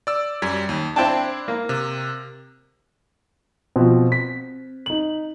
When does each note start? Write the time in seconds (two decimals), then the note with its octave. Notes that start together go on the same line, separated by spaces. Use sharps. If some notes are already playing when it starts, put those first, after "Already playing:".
0.07 D5 E6
0.42 F#2 G3 G#6
0.69 D#2
0.96 C4 D4 E4 G5 A5
1.48 A#3
1.69 C3
3.76 B2 F3 C4
4.12 B6
4.86 D#4 F#7